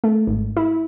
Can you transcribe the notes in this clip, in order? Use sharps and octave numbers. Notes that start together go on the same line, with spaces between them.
A3
G#1
E4